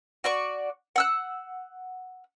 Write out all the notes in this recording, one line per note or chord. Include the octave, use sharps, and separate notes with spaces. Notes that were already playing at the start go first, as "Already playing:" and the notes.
F#4 D5 C#6
F#5 E6 F#6